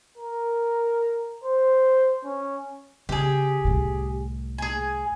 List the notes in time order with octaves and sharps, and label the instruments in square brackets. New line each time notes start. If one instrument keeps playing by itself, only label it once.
[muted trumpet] A#4
C5
C#4
[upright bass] C#3 [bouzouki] G4 G#4
[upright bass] C2 A2
[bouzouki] G#4 G#5